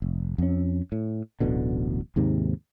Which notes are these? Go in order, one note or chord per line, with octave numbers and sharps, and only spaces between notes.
F1
F2 C#4
A2
D1 A1 B2 D3
D#2 G#2 C3 D#3